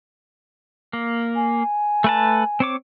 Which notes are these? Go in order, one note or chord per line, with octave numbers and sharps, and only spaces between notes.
A#3
G#5
A3 B4 A5
C4 C#5 D6